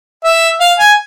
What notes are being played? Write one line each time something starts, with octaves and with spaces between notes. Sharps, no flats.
E5
F5
G#5